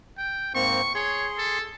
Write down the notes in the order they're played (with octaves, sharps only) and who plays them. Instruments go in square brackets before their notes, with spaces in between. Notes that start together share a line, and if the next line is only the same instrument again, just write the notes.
[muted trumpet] G5
[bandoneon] G#2 A#3 C4 [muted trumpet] C#6
[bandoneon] G#4 C6 [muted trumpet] C#5
[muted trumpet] A4